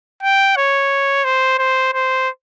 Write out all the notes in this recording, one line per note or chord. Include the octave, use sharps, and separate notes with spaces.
G5
C#5
C5
C5
C5